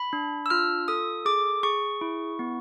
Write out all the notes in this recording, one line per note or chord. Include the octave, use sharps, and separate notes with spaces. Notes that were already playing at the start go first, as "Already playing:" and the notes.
Already playing: B5
D4
E6
F4 F6
A4 D#6
G#4 D6
G#4 C#6
E4
B3